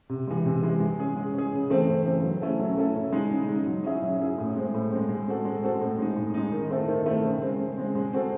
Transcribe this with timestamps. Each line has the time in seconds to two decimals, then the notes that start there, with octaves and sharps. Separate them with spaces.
0.09 C3
0.27 E3 G#3
0.46 C3
0.62 E3 G#3
0.80 G#3
0.99 C#4 G#4
1.16 G#3
1.34 C#4 G#4
1.53 C#3
1.70 E3 A3 C4
1.88 C#3
2.06 E3 A3 C4
2.24 F#3
2.42 A3 C#4 E4 A4
2.59 F#3
2.77 A3 C#4 E4 A4
2.95 C#3
3.13 G#3 D#4
3.30 C#3
3.48 G#3 D#4
3.67 F#3
3.84 C#4 E4 G#4
4.02 F#3
4.20 C#4 E4 G#4
4.38 A2
4.56 G#3 C4
4.74 A2
4.91 G#3 C4
5.09 G#3
5.27 C4 F#4 A4
5.45 G#3
5.63 C4 F#4 A4
5.81 A2
5.98 G#3 D#4
6.16 A2
6.34 G#3 D#4
6.52 D#3
6.70 A3 C4 E4 A4
6.88 D#3
7.06 A3 C4 E4 A4
7.24 C#3
7.41 G#3 C4
7.59 C#3
7.77 G#3 C4
7.95 G#3
8.13 C4 F#4 A4